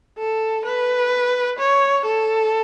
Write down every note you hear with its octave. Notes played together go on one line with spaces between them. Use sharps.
A4
B4
C#5
A4